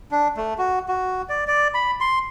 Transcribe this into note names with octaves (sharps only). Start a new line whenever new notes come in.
D4
A3
F#4
F#4
D5
D5
B5
C6